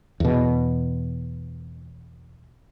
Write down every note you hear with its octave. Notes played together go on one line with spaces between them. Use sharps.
E2 B2